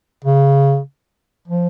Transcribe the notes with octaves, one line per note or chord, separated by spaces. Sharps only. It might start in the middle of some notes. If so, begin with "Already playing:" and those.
C#3
F3